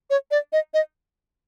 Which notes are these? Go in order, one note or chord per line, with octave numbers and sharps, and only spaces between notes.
C#5
D5
D#5
D#5